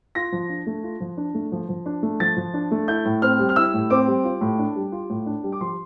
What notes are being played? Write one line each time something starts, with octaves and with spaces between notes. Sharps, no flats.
F4 A#6
F3
D4
A3
F4
F3
D4
A3
F3
F3
D4
A3
F3 A6
F3
D4
A3
E4 G6
A2
C4 F6
G3
F6
E4 E6
A2
C4 D6
G3
F4
A2
D4
G3
F4
A2
D4
G3
D6
F3 C6